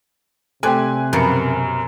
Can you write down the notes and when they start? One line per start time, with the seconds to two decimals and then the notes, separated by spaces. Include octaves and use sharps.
0.63 C3 A3 C4 G4 D5 G#5 F#6
1.13 F#2 B2 F3 A#4 C#7